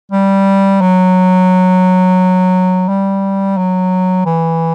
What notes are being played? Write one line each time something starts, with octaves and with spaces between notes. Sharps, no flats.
G3
F#3
G3
F#3
E3